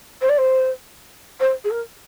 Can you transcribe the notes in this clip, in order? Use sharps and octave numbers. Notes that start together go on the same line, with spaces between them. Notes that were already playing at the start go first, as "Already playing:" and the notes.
C5
D5
C5
C5
G#4
A#4